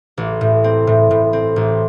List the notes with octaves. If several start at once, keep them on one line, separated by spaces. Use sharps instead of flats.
A1
A2
C4
A2
A2
C4
A1